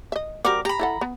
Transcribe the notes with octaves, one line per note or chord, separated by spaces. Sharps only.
D#5 E5
G3 C4 F#4 A#4 D6
G4 A#5 B5
E4 A4 F#5
B3